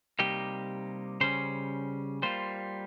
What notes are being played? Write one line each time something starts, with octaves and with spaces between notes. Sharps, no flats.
C3 G3 A#3 D#4 G4
C#3 G3 C#4 C5
G3 A#3 F4 C5